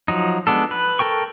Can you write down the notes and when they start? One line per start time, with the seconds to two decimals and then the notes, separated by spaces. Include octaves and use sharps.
0.08 F3 F#3 D#4
0.47 G#3 B3 D4 A4
0.71 B4
0.99 A4 A#4 G5 C#6